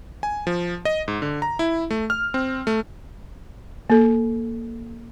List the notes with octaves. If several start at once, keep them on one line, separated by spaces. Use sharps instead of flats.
G#5
F3
D#5
G#2
D3
A#5
E4
A3
F6
C4
A3
A#3 A4